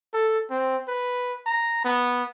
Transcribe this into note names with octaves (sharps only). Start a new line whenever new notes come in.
A4
C4
B4
A#5
B3